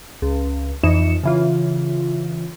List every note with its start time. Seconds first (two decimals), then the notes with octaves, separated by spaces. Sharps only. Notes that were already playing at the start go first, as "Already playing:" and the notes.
0.22 C#2
0.83 F2 E3 D#4 C#7 E7
1.23 C#3 E3 F4